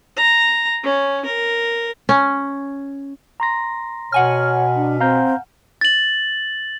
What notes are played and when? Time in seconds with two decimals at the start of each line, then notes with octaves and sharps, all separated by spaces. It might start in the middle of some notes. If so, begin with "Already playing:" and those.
0.17 A#5
0.84 C#4
1.25 A#4
2.09 C#4
3.40 A#5 C6 A#6
4.12 B2 C#5 F#5 G#5 F6
4.76 D4
5.01 C4 F5 A#5 G6
5.81 A6 F#7